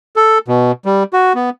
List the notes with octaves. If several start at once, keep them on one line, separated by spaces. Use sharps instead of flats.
A4
B2
G3
F#4
B3